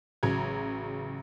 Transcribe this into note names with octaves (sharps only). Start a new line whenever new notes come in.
A1 C#3 F#3 A#5 G#6